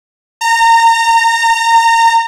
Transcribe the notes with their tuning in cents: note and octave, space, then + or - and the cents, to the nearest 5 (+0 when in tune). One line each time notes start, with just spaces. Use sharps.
A#5 -25